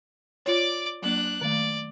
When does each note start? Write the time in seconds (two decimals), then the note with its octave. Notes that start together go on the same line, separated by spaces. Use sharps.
0.46 F4 C#5 D5 D6
1.02 F#3 A#3 D4 F#6
1.41 D#3 A3 D5